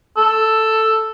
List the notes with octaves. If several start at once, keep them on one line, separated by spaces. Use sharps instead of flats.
A4